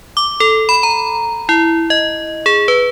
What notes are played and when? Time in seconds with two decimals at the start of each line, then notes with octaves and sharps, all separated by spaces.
0.17 D6
0.40 A4
0.69 B5
0.83 A#5
1.49 E4
1.90 D#5
2.46 G#4
2.68 B4